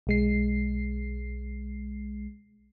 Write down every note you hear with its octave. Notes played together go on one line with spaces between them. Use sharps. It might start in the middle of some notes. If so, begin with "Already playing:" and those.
B1 G#3 C7